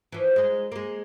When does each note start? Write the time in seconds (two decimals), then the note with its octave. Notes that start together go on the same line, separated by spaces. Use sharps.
0.12 E3 F3
0.36 G#3 D#4
0.72 G#3 A#3